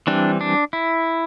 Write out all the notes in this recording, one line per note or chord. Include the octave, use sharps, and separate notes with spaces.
E3 G3 C4 D4
D4
E4